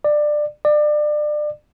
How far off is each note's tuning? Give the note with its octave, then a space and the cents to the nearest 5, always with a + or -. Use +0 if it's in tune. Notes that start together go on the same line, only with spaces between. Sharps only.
D5 +20
D5 +30